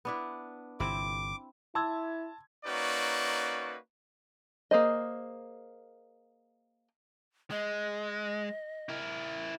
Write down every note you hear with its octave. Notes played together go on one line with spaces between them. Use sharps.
B3 D4 E4
G1 C3 C4 E4 D6
E4 A5 C6 D6 E6 G#6
A#3 C#4 D#4 F#4 B4 D5
A#3 G#4 C5 D#5
G#3 D#5
E4 A#4